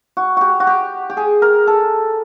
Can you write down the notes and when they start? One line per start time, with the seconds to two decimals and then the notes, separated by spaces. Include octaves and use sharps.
0.17 F#4
0.37 F#4 G4
0.60 F#4
0.67 G4
1.10 G4
1.17 G#4
1.42 A#4
1.67 A4